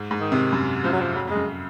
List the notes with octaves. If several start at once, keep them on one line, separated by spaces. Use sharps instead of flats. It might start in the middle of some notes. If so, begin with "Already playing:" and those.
Already playing: G#2
G#2
D#3
C3
F#2
F#2 F3
F#3
F3
F2 F#3
F2
F#2 G#3